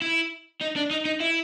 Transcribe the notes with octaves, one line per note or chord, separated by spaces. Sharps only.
E4
D#4
D4
D#4
D#4
E4